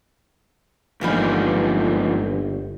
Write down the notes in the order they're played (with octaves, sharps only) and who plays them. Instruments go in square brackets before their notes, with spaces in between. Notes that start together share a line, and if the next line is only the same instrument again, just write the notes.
[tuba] G1 [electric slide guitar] G#2 F3 D#4 [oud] E3 A#3 B4